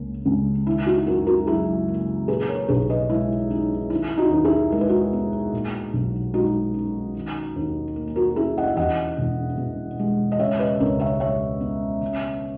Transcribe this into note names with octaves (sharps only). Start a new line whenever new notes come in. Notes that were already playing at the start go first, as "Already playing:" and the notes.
Already playing: C#2 A#3
C#2
D#3 E4
D#4 F#4
F#2 F#4 A#4
F#4 A#4
F#3 E4 G#4
A#3
A#2 G#4 B4
A#4 C#5
B1 G#4 B4
B4 D#5
G#3 E4
C#4 D#4
D#3 E4
D#4 F#4
D#2
E4 G#4
G#3 A#4
B4
F#4 A#4
B3
A#2
B1
G#3 D#4 F#4
C#4
D#3
D#2
A#3
F#4 A#4
C#4 E4 G#4
D#5 F#5
E5
E2 D#5 F#5
E1
B2
G#3
D#5
C#3 C#5 E5
B4 D#5
C#2 A#4 C#5
C#5 E5
G#3 C#5 E5
B3
C#3